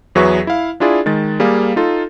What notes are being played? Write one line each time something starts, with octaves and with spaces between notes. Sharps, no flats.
E2 F#3 G#4 B4 E5 C#6
E4 F5
D4 E4 F4 G#4 D5
D#3 G#3 A6
G3 A#3 G#4 F5
D#4 F4 A4